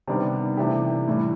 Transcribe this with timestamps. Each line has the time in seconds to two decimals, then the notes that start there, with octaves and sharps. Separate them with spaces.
0.08 C3 D#3 G3 B3 D4
0.57 C3 E3 A3 D4 G4
1.07 A2 E3 G3